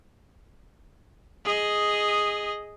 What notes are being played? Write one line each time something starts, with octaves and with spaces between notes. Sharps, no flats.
G#4 D#5